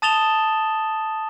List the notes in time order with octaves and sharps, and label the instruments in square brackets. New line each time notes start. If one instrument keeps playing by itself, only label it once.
[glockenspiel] A5 D#6 A6 E7 F7 G7